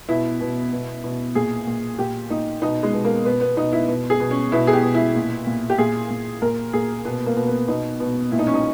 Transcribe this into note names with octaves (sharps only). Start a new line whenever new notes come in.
B2 E4
B2
B2
B2
A#2 G#4
A#2
A#2 G4
A#2 D#4
B2 D#4
G#3
B2
A#3
B2 B3
B3
B2 D#4
E4
B2
G#4
B2
C#4
B2 E4
G#4
G4
B2
E4
A#2
A#2
G4
A#2 G#4
A#2
A#2 A#4
A#2 G#4
B2 B3
A#3
B2
B3
B2 D#4
B2
A#2 E4
D#4
C#4
D#4